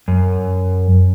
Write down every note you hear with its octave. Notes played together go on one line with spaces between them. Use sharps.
F#2